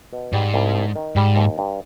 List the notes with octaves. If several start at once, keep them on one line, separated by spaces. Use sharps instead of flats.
B2
G#2 G3
C2
D4
D#3
G#2 G3
D#2
G2